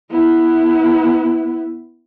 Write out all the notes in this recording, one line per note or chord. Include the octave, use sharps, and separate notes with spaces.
B3 E4